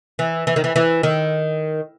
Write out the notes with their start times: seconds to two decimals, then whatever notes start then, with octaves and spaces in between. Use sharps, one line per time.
0.19 E3
0.47 E3
0.56 D#3
0.64 E3
0.76 E3
1.03 D#3